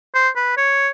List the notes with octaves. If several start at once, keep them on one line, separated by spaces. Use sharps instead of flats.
C5
B4
C#5